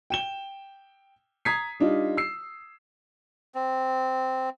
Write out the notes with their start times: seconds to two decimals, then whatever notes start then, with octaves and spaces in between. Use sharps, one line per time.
0.10 G5 E7 G7
1.45 A#5 D#6 G#6 B6 C7
1.80 G3 D4 D#4 F4
2.17 E6 C7
3.55 C4